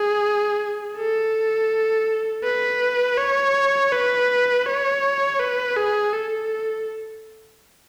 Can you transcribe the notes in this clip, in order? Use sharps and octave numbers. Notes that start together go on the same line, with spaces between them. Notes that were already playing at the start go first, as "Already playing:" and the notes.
Already playing: G#4
A4
B4
C#5
B4
C#5
B4
G#4
A4